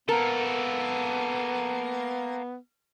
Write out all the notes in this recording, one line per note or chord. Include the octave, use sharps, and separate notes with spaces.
A#3 B3 A4 A#4